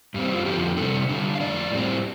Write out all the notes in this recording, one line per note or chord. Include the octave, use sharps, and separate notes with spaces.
G2 G3 C4
F4
F2 D3 F3 C4 G4
C3 G3 C4 A4
D3 G3 D4
F5
F2 C3 A3 D5
A2 G3 C4